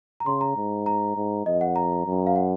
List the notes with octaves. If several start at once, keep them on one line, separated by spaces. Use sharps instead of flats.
A#5
C#3 C6
A#5
G#2
A#5
G#2
F2 D#5
F#5
A#5
F#2
F5
F#5